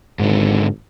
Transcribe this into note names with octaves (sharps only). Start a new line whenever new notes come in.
G#1 G#2 D3